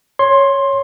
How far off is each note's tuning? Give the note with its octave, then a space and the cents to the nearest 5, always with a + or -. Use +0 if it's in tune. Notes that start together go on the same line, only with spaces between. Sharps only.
C#5 +0 C6 +15